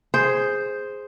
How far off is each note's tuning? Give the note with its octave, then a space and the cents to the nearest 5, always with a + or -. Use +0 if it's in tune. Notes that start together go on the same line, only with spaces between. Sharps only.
G#4 +0 C5 +0